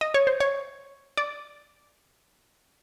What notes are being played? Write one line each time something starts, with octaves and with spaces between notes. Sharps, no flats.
D#5
C#5
C5
C#5
D5